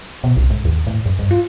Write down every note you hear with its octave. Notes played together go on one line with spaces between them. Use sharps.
B2
B1
G#2
D#2
A2
F#2
G2
F4